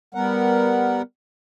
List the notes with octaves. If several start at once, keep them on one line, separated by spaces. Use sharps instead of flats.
G3 B3 A#4 F#5